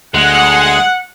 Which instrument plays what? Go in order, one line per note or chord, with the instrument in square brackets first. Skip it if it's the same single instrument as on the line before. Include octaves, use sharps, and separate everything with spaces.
[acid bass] D2 [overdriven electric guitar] G#3 [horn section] F#5